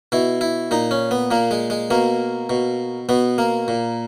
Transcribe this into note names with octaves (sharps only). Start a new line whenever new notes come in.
B2 E4
E4
A#2 D#4
C#4
B3
A#2 A#3
G#3
G#3
B2 A#3
B2
B2 B3
A#3
A#2